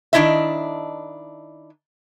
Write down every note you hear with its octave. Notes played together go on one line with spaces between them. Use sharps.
D#3 G#3 D4 E4 D#5 E5